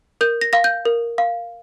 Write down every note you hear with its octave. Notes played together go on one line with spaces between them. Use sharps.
A#4 G6
A#6
F5 A#6
G6
A#4
F5